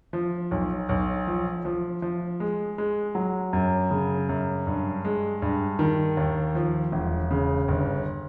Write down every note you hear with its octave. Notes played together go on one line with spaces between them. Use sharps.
F3
B1
B1
F3
F3
F3
G#3
G#3
F#3
F#2
C#3
F#2
G2
G#3
G2
D#3
D#2
F3
E1
C#3
G1